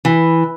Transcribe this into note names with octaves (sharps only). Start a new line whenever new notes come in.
E3